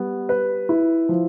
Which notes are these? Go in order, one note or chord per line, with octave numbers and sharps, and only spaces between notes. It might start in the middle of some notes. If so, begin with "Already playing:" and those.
Already playing: G3 B3
B4
E4
F3